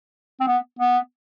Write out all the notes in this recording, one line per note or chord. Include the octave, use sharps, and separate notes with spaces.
C4
B3
B3